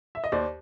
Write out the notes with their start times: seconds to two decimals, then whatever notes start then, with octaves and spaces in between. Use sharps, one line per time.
0.15 E5
0.24 D#5
0.32 D#2 C5 D5